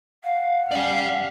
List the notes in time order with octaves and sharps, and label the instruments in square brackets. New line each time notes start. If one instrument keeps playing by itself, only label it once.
[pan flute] F5 [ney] F#5
[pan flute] C#4 [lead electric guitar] D5 G5 [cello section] F5